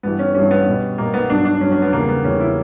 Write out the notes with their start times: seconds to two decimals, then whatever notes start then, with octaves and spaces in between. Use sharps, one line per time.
0.03 G2 E3 G3 B3
0.19 C#4
0.35 G2 E3 G3 C#4
0.51 B3
0.67 B2 G3
0.98 B2 G3 A#3
1.14 B3
1.30 G2 F#3 D4
1.45 D4
1.61 G2 C#4
1.64 F#3
1.72 C#4
1.82 B3
1.92 E2 C#3 G3 A#3
2.08 B3
2.24 E2 C#3 G3 C#4
2.40 E4